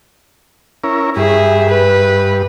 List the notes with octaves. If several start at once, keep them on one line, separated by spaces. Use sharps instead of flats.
C#4 E4 A#4
G2 G#4 E5
B4